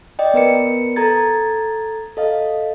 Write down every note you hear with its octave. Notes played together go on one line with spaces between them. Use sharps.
D5 D#5 G5
B3 A#4 B4 C#7
A4 A#5 G#6 A6
A4 D#5 F5